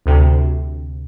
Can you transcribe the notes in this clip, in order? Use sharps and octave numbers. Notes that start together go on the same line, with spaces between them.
D2 C3